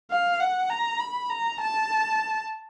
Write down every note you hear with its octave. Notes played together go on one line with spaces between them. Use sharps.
F5
F#5
A#5
B5
A#5
A5